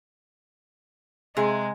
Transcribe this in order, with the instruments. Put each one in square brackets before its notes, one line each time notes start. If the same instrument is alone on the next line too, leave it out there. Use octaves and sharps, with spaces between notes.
[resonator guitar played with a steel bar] C3 G#4 [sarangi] G#3